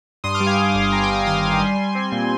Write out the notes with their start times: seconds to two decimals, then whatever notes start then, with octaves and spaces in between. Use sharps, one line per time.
0.24 G2 C6 D#6
0.35 D6 F6
0.40 G3
0.46 F5 G#5
0.58 G2
0.75 G1
0.92 G3 G5 A#5
1.03 G5 A#5
1.09 G2
1.15 G5 A#5
1.26 D#3 G#5 C6
1.44 G1
1.60 G3
1.77 G3
1.95 C4
2.12 A#2